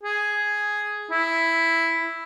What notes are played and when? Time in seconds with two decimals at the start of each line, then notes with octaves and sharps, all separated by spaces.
0.03 G#4
1.11 E4